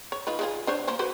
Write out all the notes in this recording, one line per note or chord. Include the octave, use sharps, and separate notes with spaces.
C#5
D#4 F4 B4
G#3 F4 G#4
D4 C5 C#5
F3 A#3 C5
F#4 B4 C5